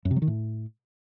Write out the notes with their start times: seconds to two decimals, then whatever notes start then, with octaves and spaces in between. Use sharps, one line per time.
0.05 F#2
0.11 C3
0.16 F#3
0.22 D#3
0.27 A2